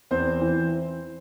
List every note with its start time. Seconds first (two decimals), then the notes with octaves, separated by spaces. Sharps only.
0.11 E2 C4 C5
0.41 E3